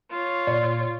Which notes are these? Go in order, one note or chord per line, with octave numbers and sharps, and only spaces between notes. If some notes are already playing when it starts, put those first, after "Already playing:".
F4 C#5
A#2 D5